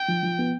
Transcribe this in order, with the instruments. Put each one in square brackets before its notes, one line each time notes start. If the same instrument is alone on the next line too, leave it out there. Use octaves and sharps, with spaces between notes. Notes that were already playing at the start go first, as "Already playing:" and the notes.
Already playing: [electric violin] G5
[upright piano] F3
F3
B3